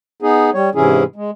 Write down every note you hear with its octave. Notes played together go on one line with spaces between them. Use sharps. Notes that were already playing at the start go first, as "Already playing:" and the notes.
B3 D#4 G#4
G3 C#5
G#2 C3 E3 C#4 E4 G#4
G#3